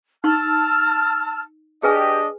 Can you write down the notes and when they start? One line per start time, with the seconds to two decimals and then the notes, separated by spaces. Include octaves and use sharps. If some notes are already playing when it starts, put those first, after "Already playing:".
0.24 D#4 A5 C#6 E6 F6
1.83 D4 G4 G#4 B4 D#5 G#5